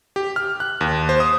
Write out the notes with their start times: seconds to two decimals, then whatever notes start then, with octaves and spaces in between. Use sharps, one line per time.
0.16 G4
0.36 F6
0.60 F#6
0.81 D#2
1.09 C5
1.20 D#6